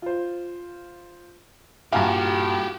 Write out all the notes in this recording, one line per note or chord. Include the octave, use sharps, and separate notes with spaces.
F4 C5
G2 A#2 F#4 G4 F5 F#5 G#5 A#5